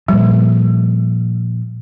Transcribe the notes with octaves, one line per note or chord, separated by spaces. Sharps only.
A#2 F3 G3